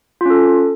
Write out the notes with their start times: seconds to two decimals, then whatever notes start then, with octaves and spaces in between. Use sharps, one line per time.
0.21 F4
0.25 C#4
0.30 A4